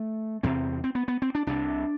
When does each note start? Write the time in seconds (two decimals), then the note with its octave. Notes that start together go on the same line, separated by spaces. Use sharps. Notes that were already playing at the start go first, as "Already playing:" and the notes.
Already playing: A3
0.43 E2 C3 C4
0.84 C4
0.95 B3
1.08 B3
1.22 C4
1.35 D4
1.47 C2 C3 D4